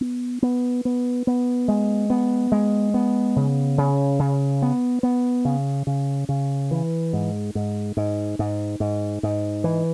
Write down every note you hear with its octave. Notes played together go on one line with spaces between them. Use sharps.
B3
B3
B3
B3
G#3
B3
G#3
B3
C#3
C#3
C#3
B3
B3
C#3
C#3
C#3
E3
G#2
G#2
G#2
G#2
G#2
G#2
E3